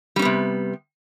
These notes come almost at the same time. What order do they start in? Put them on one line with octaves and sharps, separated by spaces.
G3 C#4 B3 C3